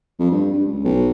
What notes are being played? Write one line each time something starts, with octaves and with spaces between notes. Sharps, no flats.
F2
G2
G2
C#2
B1